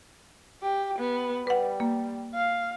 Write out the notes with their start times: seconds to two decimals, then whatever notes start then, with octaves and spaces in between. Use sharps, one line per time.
0.62 G4
0.98 B3
1.47 G3 B4 F#5
1.80 A#3
2.34 F5